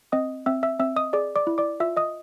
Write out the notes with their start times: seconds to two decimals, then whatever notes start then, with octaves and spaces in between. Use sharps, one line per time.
0.12 C4 D#5 D#6
0.46 C4 E5 E6
0.63 E5 E6
0.79 C4 E5 E6
0.96 D#5 D#6
1.13 G#4 D5 D6
1.36 D5 D6
1.47 E4
1.58 D5 D6
1.80 F4 E5 E6
1.97 D#5 D#6